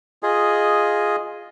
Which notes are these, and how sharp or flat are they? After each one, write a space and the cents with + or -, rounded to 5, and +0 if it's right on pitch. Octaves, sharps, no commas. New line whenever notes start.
F4 +5 G#4 +0 D#5 +0